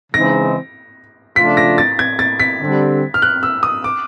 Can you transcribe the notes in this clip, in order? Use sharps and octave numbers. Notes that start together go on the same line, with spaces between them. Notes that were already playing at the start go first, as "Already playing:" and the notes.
C#3 E3 G#3 C4 D#4 A#6
C#3 F3 A3 D4 F4 B6
A#6
A6
G#6
A6
B6
D3 G3 C4
F6
F#6
E6
D#6
D6